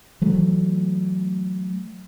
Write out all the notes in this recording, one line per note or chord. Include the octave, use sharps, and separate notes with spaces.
E3 F#3 A3